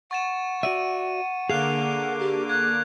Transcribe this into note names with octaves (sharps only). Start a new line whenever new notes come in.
F#5 C#6 A6 E7
F#4 D5 E5 D#7
D3 A#3 G#4 F5 D6 F#6 C7 F7
G4
F#6 G#6